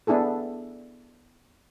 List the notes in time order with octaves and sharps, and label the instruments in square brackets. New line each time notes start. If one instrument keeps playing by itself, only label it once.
[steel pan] B3 D4 E4 G#4 A4